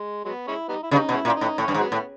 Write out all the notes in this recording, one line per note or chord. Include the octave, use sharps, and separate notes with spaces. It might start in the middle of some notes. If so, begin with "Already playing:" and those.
Already playing: G#3
F#3 G#3 B3
G#3 C#4 E4
G3 B3 D#4
E4
C#3 G3 B3 D#4
B2
G#3 C#4 E4
A#2
D#4
A2
A2 C#4
G2
G#2
F#3 G#3 B3
A2